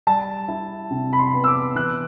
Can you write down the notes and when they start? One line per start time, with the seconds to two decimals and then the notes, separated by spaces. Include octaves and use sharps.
0.07 G3 A5
0.48 E4
0.91 C3
1.13 B5
1.19 C6
1.34 B3
1.44 E6
1.47 D6
1.75 E3 F#6